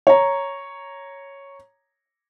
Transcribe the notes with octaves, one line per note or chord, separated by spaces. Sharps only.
C#5 A#5